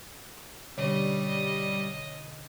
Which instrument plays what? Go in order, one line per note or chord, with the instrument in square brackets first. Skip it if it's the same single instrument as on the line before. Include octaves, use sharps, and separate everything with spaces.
[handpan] B2 D3 C#4 [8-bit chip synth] G3 [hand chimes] C#5 [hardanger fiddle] D#5